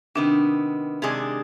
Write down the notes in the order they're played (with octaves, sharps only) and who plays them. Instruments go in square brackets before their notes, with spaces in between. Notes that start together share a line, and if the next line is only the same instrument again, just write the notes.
[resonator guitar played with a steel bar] C3 D#3 B3 [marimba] D4
[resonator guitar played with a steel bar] C3 D#3 G#3 D4 G#4